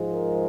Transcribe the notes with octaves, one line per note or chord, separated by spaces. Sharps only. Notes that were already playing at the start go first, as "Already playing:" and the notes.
Already playing: G#2 F3 G#3
A#4